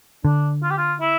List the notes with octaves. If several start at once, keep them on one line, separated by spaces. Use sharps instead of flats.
D3 D4
F4
G4
F4
E4